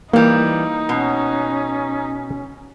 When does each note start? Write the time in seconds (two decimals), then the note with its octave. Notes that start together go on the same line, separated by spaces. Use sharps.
0.13 E3 G3 A#3 D#4
0.89 B2 C#4